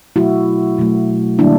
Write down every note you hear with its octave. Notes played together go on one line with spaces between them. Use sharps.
B2 F#3 A3 E4 F#4
B2 F#3 A3
D#3 G3 A#3 D4 E4